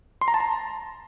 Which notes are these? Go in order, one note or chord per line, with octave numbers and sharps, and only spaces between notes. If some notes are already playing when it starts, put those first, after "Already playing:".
C6
A#5
A5
A#5